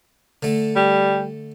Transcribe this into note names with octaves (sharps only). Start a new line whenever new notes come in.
D3 A3
G3